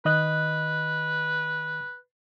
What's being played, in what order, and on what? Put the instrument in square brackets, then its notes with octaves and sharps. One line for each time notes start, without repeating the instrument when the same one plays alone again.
[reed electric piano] D#3 D#5 F#6 [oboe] B4